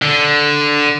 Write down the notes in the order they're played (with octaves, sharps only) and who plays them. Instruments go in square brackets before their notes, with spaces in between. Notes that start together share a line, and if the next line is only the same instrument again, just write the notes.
[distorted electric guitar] D3